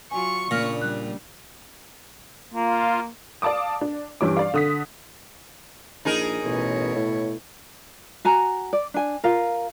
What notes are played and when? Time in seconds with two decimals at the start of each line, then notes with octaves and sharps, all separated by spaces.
0.11 F#3 F4 G#5 C#6
0.51 A#2 C#3 A#3 D4 F6 A#6
0.82 G3 F#6
2.54 A#3 F4
3.42 D5 F5 A5 D6 D#6
3.81 D4
4.21 G2 E3 G3 C#4 D6
4.37 D5 F5
4.54 D3 D#6 B6
6.05 A#1 D#4 G#4 A#4
6.45 A1 B2 C#5
6.95 A2
8.25 F#4 G#5 A#5
8.73 D5
8.94 D4 G#5
9.24 F4 A#4 F5